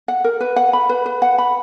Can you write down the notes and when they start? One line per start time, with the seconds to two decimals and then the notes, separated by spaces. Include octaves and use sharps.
0.08 F#5
0.24 A#4
0.41 B4
0.56 F#5
0.73 B5
0.89 B4
1.06 B4
1.22 F#5
1.38 B5